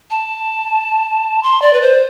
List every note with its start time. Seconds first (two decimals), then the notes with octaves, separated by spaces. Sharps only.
0.11 A5
1.43 C6
1.62 D5
1.73 B4
1.82 C5